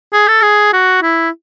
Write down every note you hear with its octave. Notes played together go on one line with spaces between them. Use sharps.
G#4
A4
G#4
F#4
E4